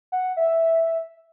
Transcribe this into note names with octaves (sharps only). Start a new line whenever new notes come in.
F#5
E5